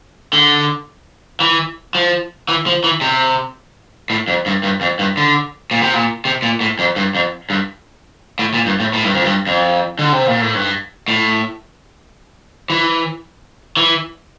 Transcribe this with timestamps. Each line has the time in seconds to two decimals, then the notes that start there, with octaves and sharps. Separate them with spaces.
0.33 D3
1.40 E3
1.95 F3
2.49 E3
2.67 F3
2.84 E3
3.01 C3
4.10 A2
4.28 F2
4.46 G2
4.63 G2
4.81 F2
4.99 G2
5.17 D3
5.71 A#2
5.82 C3
5.94 A#2
6.25 C3
6.42 A#2
6.61 A2
6.79 F2
6.96 G2
7.15 F2
7.50 G2
8.39 A2
8.54 A#2
8.66 G2
8.80 A2
8.93 A2
9.04 G2
9.15 F2
9.25 G2
9.47 F2
9.99 D3
10.12 C3
10.27 A#2
10.41 A2
10.55 G2
11.08 A2
12.70 E3
13.77 E3